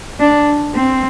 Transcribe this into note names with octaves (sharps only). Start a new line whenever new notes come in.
D4
C4